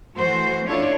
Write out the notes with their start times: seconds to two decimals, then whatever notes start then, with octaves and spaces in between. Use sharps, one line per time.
0.17 E3 A3 F#4 C5
0.66 C#4 D4 E4 F4 A4 C#5